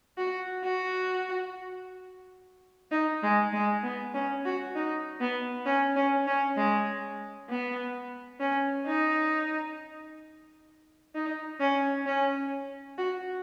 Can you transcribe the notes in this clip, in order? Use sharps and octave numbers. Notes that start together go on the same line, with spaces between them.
F#4
F#4
D#4
G#3
G#3
B3
C#4
F#4
D#4
B3
C#4
C#4
C#4
G#3
B3
C#4
D#4
D#4
C#4
C#4
F#4